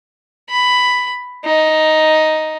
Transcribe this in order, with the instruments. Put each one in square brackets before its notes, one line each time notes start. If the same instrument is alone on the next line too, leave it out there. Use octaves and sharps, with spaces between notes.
[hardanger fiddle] B5
D#4